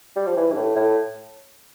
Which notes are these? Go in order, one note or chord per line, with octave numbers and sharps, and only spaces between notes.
G3
F3
E3
G2
A2
A2